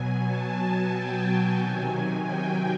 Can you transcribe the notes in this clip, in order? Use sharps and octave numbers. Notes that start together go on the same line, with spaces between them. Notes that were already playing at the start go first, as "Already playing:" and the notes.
Already playing: B2 F#3 G#5
A5
G#5
G5
A5
C3 D#3 F#3 G#5
G5